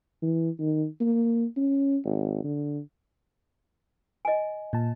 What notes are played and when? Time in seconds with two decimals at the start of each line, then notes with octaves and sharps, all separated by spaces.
0.22 E3
0.60 D#3
1.00 A#3
1.57 C#4
2.05 G#1
2.44 D3
4.25 D#5 G#5
4.73 A#2 A5